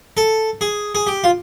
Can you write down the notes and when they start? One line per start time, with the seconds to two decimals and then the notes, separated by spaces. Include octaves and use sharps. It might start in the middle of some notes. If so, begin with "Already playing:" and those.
0.17 A4
0.61 G#4
0.95 G#4
1.07 G4
1.24 F4